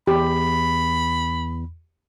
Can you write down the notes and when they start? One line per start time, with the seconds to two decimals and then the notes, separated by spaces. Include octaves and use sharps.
0.07 E2 G4 B5